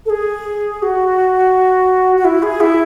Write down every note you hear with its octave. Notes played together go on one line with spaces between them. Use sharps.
A4
G#4
F#4
F#4
E4
G#4
E4